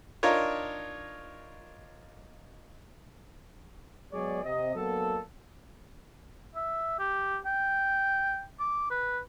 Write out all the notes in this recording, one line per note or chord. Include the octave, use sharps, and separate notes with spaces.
D4 D#4 F4 A#4 C#5
F#3 G#3 B3 G#4 C#5 D5
C3 D#5
F#3 A#3 B3 D4 A4
E5
G4
G5
D6
B4